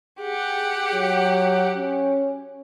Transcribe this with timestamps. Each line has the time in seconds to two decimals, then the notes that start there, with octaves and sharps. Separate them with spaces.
0.21 G4 G#4 F#5
0.94 F#3
1.77 C#4